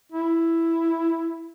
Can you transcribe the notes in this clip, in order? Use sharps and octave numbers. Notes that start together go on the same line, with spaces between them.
E4